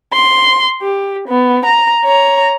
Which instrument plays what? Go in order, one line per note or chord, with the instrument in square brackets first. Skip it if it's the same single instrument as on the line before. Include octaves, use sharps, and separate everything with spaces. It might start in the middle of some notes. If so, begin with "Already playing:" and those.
[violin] C6
G4
B3
A#5
C#5 A#5